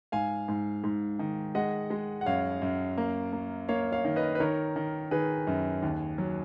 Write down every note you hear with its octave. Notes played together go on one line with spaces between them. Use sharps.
G#2 F5 G#5
G#2
G#2
D#3
G#3 D#5 F#5
G#3
F#5
F#2 C#5 F5
F#2
A#3
A#3
A#3 C#5 F5
C#5 F5
D#3
B4 D#5
B4
D#3 A#4 C#5
D#3
D#3 G#4 B4
F#2
D#2
F#3